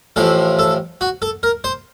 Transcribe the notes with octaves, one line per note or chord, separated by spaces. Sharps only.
A1 A2 F3 A4
A4
F#4
A4
A#4
C5